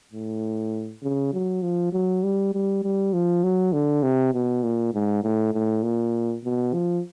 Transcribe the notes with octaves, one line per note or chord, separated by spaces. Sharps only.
A2
C#3
F#3
F3
F#3
G3
G3
G3
F3
F#3
D3
C3
B2
A#2
G#2
A2
A2
A#2
B2
F3